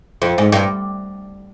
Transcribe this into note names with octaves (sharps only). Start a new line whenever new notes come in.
F2
G#2
G2